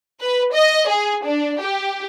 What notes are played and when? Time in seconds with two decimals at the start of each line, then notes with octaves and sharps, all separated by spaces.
0.21 B4
0.54 D#5
0.89 G#4
1.25 D4
1.61 G4